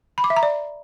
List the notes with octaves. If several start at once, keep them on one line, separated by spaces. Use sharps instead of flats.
B5
D6
E5
A#5
D5